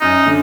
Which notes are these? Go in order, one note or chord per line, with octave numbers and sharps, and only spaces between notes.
F#2 D#4
D3